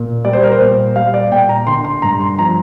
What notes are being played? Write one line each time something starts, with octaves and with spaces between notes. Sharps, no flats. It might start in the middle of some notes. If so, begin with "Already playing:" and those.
Already playing: A#2
G3 D5
C5
A#4
C5
A#2
G3 F5
D5
A#2 G5
A#5
D3 C6
C6
G2 A#5
C6
F3 A#5